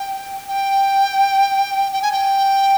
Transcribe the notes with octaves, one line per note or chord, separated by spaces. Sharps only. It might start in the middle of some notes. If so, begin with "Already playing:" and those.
Already playing: G5
G5
G5
G#5
G5